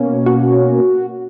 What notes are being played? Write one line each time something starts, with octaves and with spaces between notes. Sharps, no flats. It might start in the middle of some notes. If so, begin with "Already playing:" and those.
Already playing: B2 A#3 C#4
F#4